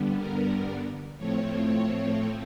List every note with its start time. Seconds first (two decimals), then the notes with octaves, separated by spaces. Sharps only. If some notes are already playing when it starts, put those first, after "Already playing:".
Already playing: G2 D3 G3 B3
0.18 A#4
1.18 A2 F3 A3 C4 C#5